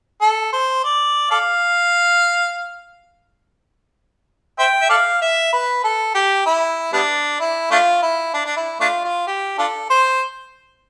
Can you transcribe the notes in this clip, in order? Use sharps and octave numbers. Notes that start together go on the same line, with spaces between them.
A4
C5
D5
A4 D5 F5
C5 E5 G5
E5
A4 D5 F5
E5
B4
A4
G4
E4
G3 B3 D4
E4
A3 D4 F4
E4
D4
D4
E4
A3 D4 F4
F4
G4
D4 F4 A4
C5